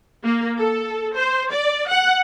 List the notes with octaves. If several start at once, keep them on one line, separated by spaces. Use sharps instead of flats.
A#3
A4
C5
D5
F#5